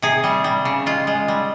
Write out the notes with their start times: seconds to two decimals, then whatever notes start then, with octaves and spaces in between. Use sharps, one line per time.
0.02 C3 G#4
0.24 G3
0.44 G3
0.65 C#3
0.86 G#3 F4
1.07 G#3
1.28 G3